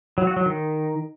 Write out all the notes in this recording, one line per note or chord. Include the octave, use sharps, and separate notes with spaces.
F#3
F#4
F#3
D#3